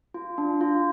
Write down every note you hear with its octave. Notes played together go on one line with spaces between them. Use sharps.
F4
D4
F4